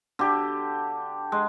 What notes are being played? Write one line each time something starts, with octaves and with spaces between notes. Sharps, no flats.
D3 G4
G#3